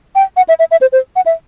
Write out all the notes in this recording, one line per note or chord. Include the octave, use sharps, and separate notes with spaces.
G5
F#5
E5
E5
E5
C5
C5
F#5
E5